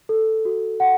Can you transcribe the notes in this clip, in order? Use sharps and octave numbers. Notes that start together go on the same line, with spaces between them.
A4
F#4
F#5